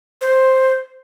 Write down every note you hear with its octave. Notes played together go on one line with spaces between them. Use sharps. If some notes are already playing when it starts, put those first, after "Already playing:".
C5